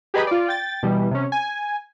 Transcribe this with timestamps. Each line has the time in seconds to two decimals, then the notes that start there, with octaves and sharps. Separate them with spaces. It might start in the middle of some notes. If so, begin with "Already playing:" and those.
0.14 G4 G#4 B4 D#5 A#5 B5
0.27 F4 D5
0.48 G5 A6
0.83 B2 E3 G3
1.11 C3 C#4
1.32 G#5